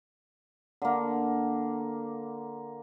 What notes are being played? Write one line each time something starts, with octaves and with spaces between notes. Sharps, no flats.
D3 A#3